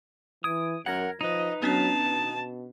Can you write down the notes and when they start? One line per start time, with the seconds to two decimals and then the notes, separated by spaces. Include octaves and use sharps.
0.44 E3 D#6 G#6 D7
0.86 F#2 A#4 F#5 G#6 A#6
1.21 F3 D#4 B4 D#5
1.62 F#3 B3 C#4 D4 A5
2.02 B2